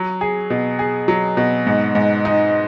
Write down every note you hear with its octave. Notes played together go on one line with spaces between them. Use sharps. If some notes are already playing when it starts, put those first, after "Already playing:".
Already playing: F#3
G#4
B2
G#4
F#3
B2
G#2
G#2
D#4